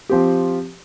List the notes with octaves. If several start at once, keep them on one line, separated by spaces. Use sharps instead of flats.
F3 C4 G4